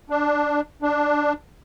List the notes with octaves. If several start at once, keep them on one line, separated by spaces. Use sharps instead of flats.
D4
D4